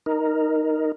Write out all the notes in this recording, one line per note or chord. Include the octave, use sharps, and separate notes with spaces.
D#4 A#4